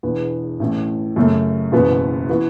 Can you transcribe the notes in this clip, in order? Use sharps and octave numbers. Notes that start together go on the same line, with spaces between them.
E1 E2 E3 B3
A1 A2 E3
F#2 C#3 A3
F#1 E2 B2 B3
E3 B3 F#4